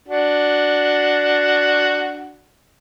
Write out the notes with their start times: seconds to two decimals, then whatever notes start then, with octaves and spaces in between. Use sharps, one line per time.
0.08 D4 F#4